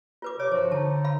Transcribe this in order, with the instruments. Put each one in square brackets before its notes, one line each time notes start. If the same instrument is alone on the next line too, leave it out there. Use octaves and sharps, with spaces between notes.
[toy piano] F4 B4 D6
[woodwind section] C3 D6 [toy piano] C#5
[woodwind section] G2 F3 F#4 [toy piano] C5
[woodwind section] D3 D#4 [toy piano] A5
[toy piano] F5 B5